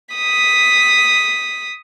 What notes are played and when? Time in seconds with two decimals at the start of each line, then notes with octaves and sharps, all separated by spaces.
0.15 D#6 B6